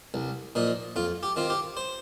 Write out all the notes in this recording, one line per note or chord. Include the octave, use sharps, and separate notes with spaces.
C2
A#2 F3 D#4
F2 F4
G4
D#3 C4 F4
G4
C5